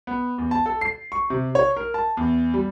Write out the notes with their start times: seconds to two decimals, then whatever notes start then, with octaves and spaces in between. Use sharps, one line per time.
0.07 B3
0.38 E2
0.51 A5
0.66 A4
0.81 C7
1.12 C#6
1.30 C3
1.55 C#5
1.76 A#4
1.94 A5
2.17 E2
2.54 G3